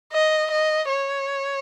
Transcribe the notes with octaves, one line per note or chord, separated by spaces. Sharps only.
D#5
D#5
C#5